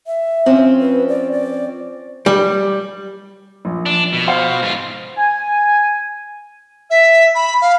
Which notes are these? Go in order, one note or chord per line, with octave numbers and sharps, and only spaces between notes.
E5
F3 C4 C#4
B4
D5
D5
G3
A#1
D4
B2
C5 F5
G#2 F4
G#5
E5
B5
F5